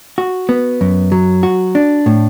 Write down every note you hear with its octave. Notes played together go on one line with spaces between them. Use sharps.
F#4
B3
F#2
F#3
F#4
D4
A2